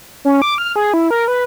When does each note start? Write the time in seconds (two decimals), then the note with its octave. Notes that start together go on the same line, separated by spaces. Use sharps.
0.25 C#4
0.42 D6
0.58 F6
0.76 G#4
0.94 E4
1.11 A#4
1.28 B4